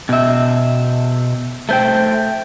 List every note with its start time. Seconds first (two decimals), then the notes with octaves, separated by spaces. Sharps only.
0.09 B2 E5
1.69 A3 C5 G5